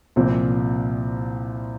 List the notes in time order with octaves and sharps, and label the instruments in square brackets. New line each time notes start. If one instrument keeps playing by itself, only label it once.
[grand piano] C2 A#2 F3 C4